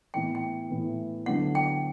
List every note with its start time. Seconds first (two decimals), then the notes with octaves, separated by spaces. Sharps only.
0.14 A2 E3 B3 G5
0.35 G5
0.70 A2 E3 B3
1.26 D2 D3 F#3 B3 E4 F#5
1.55 G5